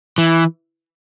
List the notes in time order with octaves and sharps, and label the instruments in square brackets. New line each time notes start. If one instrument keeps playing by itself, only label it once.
[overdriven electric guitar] E3